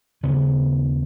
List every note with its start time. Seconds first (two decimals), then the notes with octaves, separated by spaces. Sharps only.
0.23 D#2 C#3 B3